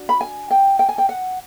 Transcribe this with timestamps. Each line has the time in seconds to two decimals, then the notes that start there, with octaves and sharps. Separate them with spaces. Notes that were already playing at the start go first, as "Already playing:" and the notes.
Already playing: D4 F#4
0.09 B5
0.21 G#5
0.51 G5
0.79 G5
0.89 G#5
0.98 G5
1.09 F#5